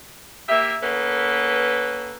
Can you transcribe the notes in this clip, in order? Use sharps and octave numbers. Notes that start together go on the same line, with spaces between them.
A#3 G4 E5
A#3 B3 C#4 A4 B4